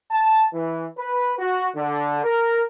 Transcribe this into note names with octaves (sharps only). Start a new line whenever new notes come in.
A5
E3
B4
F#4
D3
A#4